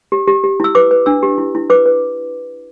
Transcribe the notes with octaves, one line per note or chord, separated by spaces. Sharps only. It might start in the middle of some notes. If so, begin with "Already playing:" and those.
G4
G4
G4
E4 E6
B4 D6
B4
D4 E6
G4
E4
E4
B4 D6
B4